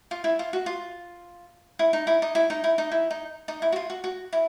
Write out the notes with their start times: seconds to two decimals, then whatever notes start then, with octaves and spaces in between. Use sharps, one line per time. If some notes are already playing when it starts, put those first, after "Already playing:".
0.11 F4
0.24 E4
0.39 F4
0.53 F#4
0.66 F4
1.79 E4
1.93 D#4
2.07 E4
2.22 D#4
2.35 E4
2.50 D#4
2.64 E4
2.78 D#4
2.92 E4
3.11 D#4
3.48 D#4
3.62 E4
3.72 F#4
3.76 F4
3.90 F#4
4.04 F#4
4.33 E4